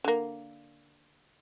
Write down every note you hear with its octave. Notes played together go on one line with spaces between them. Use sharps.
D3 A#3